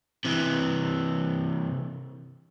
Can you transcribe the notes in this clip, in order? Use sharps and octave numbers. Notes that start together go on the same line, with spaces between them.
C3 E3